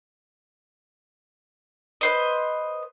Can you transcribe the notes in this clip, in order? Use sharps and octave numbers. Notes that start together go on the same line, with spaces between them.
B4 C5 D#5